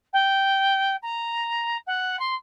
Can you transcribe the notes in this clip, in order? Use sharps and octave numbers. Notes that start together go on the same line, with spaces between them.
G5
A#5
F#5
C6